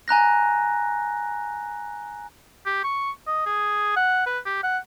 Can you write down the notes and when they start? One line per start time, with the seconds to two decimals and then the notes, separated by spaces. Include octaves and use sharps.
0.08 G#5 A#5 F#6 A#6
2.66 G4
2.84 C#6
3.27 D#5
3.46 G#4
3.96 F#5
4.27 B4
4.46 G4
4.63 F#5